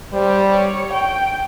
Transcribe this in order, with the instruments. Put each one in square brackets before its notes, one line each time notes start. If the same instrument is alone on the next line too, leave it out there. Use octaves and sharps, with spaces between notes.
[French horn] G3 [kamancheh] C5
[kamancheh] C#5
G5